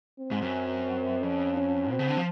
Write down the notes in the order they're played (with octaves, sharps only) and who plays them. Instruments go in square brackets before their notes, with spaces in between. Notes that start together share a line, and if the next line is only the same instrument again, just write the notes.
[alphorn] C4
[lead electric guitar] G#2
F#2
[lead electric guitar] F2 [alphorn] C#4
[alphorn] C#4
[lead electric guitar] B2 [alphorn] C4
[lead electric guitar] C#3
D3
F3